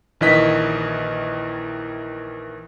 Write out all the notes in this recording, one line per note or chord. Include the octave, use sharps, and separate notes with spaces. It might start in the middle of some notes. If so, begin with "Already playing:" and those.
A#1 D#3 E3 D#5 B6